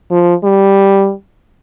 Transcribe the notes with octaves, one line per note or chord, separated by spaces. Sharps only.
F3
G3